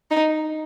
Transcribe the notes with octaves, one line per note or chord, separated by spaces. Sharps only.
D#4